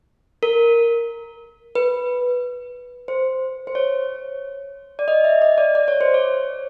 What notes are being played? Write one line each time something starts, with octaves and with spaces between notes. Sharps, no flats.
A#4
B4
C5
C5
C#5
D5
D#5
E5
D#5
D5
D5
C#5
C5
C#5